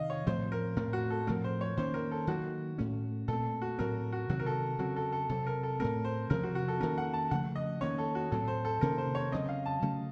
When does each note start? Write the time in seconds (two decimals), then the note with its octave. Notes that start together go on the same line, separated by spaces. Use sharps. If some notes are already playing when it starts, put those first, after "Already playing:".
Already playing: C3 D#3 D#5 F5
0.10 C#5
0.27 A2 F3 A3 C4 C5
0.52 A#4
0.76 A2 A3 C4 A#4
0.93 F#4
1.10 A4
1.27 A2 F3 A3 C4 A#4
1.44 C5
1.61 C#5
1.77 D#3 A#3 C#4 C5
1.94 A#4
2.11 A4
2.27 D#3 F#3 A#3 F#4
2.78 A2 A3 C#4
3.28 A#2 A3 C4 A4
3.62 F#4
3.78 A2 F#3 C4 A#4
4.12 F#4
4.29 C3 D#3 F#3 C4 F#4
4.39 A#4
4.46 A4
4.79 C#3 F#3 C4 F#4
4.96 A4
5.12 A4
5.29 C3 F#3 C4 A4
5.47 A#4
5.63 A4
5.80 A2 A3 C4 A#4
6.05 C5
6.30 C3 F3 C4 A#4
6.43 F#4
6.55 F#4
6.68 A4
6.80 D#3 A#3 C#4 A#4
6.98 F#5
7.13 A5
7.31 C#3 F3 A3 F#5
7.56 D#5
7.81 D#3 A#3 C#4 C#5
7.98 A4
8.15 F#4
8.32 A2 F#3 C4 A4
8.48 C5
8.65 A4
8.81 C3 D#3 A#3 C#4 A#4
8.98 C5
9.15 C#5
9.32 C#3 F#3 C4 D#5
9.49 F5
9.66 A5
9.82 C#3 F#3 A3 C#4